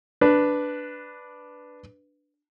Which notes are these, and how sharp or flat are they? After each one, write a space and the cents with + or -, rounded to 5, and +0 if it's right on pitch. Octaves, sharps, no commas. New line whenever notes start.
D4 +0 B4 +0